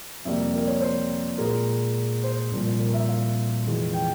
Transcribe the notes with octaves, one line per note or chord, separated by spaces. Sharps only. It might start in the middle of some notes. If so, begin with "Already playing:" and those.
F2 C3 G3 A#3 E5
A#4
C#5
C5
A#2 G#3 A#4
C5
C2 A#2 F3
A#4
E5
F5
F2 C3 E3 G#3
G5